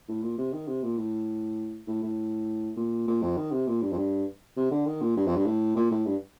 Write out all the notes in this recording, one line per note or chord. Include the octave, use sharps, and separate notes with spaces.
A2
A#2
C3
D#3
C3
A#2
A2
A2
A2
A#2
A#2
F2
D#3
C3
A#2
G2
F2
G2
C3
D3
D#3
A#2
G2
F2
G2
A2
A#2
A2
G2